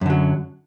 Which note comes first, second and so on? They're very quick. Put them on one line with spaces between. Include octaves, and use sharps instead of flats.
F#2 D3 F#3